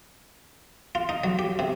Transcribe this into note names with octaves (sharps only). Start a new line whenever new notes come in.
F4
D#4
F#3
G4
C3